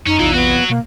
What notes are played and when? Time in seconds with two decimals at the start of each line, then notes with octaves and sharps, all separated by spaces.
0.06 F#2 C#4 D#4
0.19 A#1 E2 C3 E3 F4
0.34 F#3 B3 F#4
0.70 B2 A#3